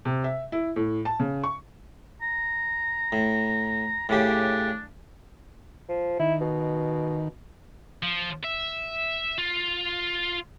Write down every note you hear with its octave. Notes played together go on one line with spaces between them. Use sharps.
C3
E5
E4
A2
A5
C#3
C#6
A#5
A2
A2 C#3 D4 G4
F3
D#3 E4
B2
F3
E5
F4